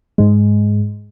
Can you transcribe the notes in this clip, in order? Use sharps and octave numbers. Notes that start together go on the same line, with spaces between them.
G#2 G#3